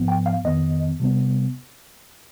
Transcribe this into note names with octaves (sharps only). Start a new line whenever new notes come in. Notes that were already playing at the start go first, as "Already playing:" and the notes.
Already playing: G#2 F3 B3
G5
F5
F2 D#3 B3 D#5
C3 G3 B3